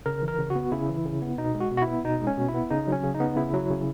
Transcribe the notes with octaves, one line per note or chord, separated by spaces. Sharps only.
C#3 A#4
E3
A#4
C#3
F#4
B3
C#3 E4
E3
C#3
B3
B2 D#4
G#3
F#4
B2
F#4
E4
B3
B2 D#4
G#3
C#4
B2
E4
B3
C#3 D#4
F#3
C#4
C#3
D#4
B3
C#3 E4
F#3
C#3